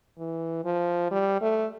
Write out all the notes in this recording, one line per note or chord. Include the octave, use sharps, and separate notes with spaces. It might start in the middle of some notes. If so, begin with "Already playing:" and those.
E3
F3
G3
A3